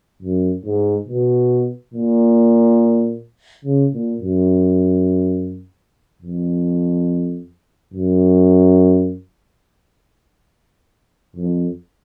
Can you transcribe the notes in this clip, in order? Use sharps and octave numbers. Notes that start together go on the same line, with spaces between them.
F#2
G#2
B2
A#2
C#3
A#2
F#2
F2
F#2
F2